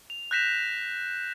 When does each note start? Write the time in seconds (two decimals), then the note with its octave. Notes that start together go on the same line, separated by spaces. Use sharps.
0.10 F7
0.31 F#6 G6 A#6 B6 E7 F7